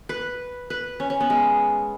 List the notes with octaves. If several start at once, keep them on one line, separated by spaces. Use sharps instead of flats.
B4
B4
C#4
C#4
B3
G#3